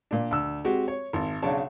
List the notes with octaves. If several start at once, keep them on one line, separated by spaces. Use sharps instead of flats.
A#2 D4
D2 E6
G#3 C4 F#4 G4
C#5
G#1
B1 C#3 D4 C#5 A5